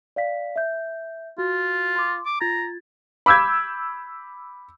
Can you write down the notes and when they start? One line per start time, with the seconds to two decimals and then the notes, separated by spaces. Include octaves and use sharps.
0.16 D5 F5 B6
0.56 E5 G6
1.38 F4 F#4
1.96 C6 D6
2.26 D6
2.41 F4 A#5 G#6 A6
3.26 B5 D6 E6 G6 G#6